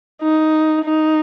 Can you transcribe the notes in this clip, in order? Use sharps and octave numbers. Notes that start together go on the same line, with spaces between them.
D#4
D#4